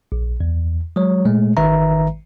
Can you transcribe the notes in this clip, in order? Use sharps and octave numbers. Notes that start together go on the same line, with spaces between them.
A#1
E2
F#3 G#3 C#5
A#2 G#3 A3
G#1 D#3 B4 E5 A#5